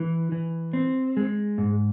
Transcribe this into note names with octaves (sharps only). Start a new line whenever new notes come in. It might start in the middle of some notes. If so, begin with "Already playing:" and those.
Already playing: E3
E3
C4
G#3
G#2